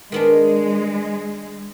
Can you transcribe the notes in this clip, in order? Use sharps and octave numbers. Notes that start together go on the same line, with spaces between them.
D#3 G#3 B3 D4